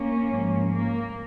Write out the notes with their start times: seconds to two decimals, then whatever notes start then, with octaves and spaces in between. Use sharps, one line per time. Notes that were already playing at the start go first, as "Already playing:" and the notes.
Already playing: A#3 C#4
0.30 G#2 F3
0.70 A#3